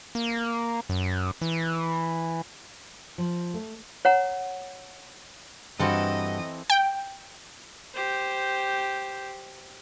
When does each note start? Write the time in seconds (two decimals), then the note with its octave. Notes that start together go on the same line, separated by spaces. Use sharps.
0.15 A#3
0.89 F#2
1.41 E3
3.18 F3
3.54 A3
4.05 C#5 F#5 A#5
5.80 G2 E3 C4 F#4 A4 D#5
6.70 G5
7.94 G4 C5